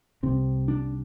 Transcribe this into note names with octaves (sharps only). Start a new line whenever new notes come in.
C2 C3 C4
D4